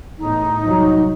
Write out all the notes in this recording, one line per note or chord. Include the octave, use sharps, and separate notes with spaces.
E2 A2 D#4
C2 F#3